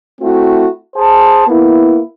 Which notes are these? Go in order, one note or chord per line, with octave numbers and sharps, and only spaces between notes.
A3 C4 E4 F#4
G#4 C5 A5
A#3 B3 E4